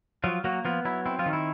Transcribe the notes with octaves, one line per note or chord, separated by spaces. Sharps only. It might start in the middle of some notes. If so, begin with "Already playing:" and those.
F3 F#3 F4
F#3 A#3 F#4
F3 B3 F4
F#3 E4
C4 E4
F3 F4
D#3
E4